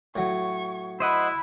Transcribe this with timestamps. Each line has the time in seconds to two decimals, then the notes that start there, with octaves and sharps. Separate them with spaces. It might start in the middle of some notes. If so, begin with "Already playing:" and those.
0.16 A2 F#3 C#6
1.00 E4 C5 D#5 F#5 B5